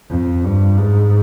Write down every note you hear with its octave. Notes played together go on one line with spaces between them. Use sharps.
F2
G2
G#2